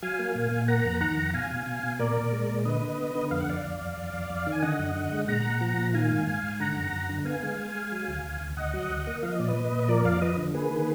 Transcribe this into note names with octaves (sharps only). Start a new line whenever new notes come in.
F#3 F5 G#5
A#3
A#2
A#2
A#3 F#5 A#5
F2
D#3 F#5 A#5
F2
B2 F5 G#5
B2
B2
B2
A#2 A#4 D5
A#2
G#3
A#2
D3 B4 D#5
D3
B3
D3
F2 F5
F#5
F2 D5 F5
F2
F2
F2
F2
F2
D#3
G#5
D3 D#5 F#5
F#2
D3
G#3
A#2 F#5 A#5
A#2
F3
A#2
D#3 F5 G#5
G#2
G#2
G#2
D3 F#5 A#5
F#2
F#2
D3
B3 F5 G#5
G#3
G#3
G#3
F#3
D2
D2
D2
D2 D#5 F#5
F#3
D2
A#3
F3 F5
D#5
A#2 D5
B4 D#5
A#2
A#2
D#5
F3 A#4 D5
F2 D5 F5
F3 B4 D#5
D3
A#3 G#4 B4
D#3